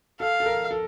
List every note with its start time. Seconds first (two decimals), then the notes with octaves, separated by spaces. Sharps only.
0.20 A4 F5
0.40 A4
0.46 A#4
0.71 A4